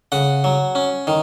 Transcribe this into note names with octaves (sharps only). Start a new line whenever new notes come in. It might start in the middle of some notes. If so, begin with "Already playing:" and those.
C#3 F#5
F#3
C#4
D#3